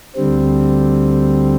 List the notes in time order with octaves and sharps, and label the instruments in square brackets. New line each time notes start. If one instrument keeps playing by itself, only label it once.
[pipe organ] D2 D3 G3 C4